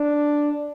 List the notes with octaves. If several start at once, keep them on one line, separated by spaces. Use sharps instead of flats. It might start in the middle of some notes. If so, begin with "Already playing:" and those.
Already playing: D4